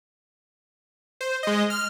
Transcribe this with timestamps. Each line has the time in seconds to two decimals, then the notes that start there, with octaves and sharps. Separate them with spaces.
1.21 C5
1.43 G#3 D#5
1.70 F6